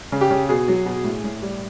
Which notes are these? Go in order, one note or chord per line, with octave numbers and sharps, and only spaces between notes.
C#3
G4
C#3
B2 G#4
F#3
B2
A2
A2
G3